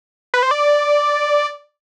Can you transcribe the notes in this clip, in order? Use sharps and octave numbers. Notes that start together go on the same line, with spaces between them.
B4
C5
D5